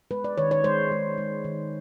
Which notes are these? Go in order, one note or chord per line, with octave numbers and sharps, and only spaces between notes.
G#3 B4
D5
D#3 C#5
C#5
G#3 C5
G#3
G#3
D#3